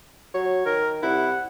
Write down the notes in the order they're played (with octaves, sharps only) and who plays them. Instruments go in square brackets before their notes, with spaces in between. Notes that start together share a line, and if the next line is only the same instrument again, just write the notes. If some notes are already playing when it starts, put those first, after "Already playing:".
[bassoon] F#3 [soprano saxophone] C#5
[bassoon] D#3 [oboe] A#4
[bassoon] C2 [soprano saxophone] E4 [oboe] F#5